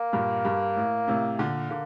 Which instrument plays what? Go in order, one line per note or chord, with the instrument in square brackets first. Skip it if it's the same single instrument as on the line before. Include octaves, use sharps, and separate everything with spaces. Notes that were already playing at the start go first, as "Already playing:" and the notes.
Already playing: [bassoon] A#3
[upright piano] G2 A#2
G2
A2
A2 C3
A#2 D3
[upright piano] D3 [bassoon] A#3